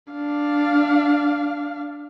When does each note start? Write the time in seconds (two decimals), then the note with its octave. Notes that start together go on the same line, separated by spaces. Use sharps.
0.12 D4 F5